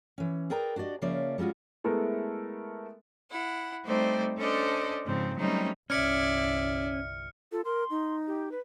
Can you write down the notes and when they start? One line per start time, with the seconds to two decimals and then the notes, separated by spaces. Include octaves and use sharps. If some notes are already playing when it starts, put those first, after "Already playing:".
0.18 E3 C#4
0.50 G#4 A#4 B4 D5 G5 A#5
0.76 D4 F#4 G4 D5 D#5
1.02 C#3 F3 A#3 C#4 D5 E5
1.38 G3 G#3 C#4 F4 F#4
1.84 G#3 A3 B3 E4 A4 A#4
3.30 E4 F#5
3.85 G3 A3 C4 D#4 C5 D5
4.38 C#4 D4 A4 C5 D5 D#5
5.06 G#2 C#3 F3 C4
5.37 F#3 G3 A3 C4 C#4 D#4
5.90 G1 C2 C#4 D5 E5 F6 C#7
7.52 F4 A4
7.65 A#4 C6
7.90 D#4
8.27 G4
8.52 B4